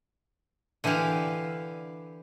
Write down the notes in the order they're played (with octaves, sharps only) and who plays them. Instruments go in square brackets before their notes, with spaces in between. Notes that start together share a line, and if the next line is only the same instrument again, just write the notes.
[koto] D3 E3 E4 G4 F5